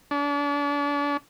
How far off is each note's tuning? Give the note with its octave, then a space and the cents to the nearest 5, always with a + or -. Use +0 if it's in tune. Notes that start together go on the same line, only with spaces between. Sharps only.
D4 -35